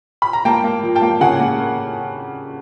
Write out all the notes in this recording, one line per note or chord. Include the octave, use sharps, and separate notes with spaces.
B5
A#5
A#3 G5 A5
A#3
F3
G5 A5
A#3
C#3 F#5 G#5
A#3